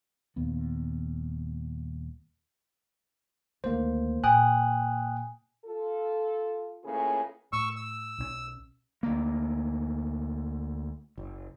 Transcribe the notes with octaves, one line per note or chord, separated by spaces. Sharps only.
D#1 D#2 B3
D2 D#3 A#3 C5
A#2 G5 G#5 D#6 F#6
F4 A4
A2 C#3 A#3 F4 G#4 B4
A2 C#6 E6
E6
B1 E3 C#4
D2 A#3
F#1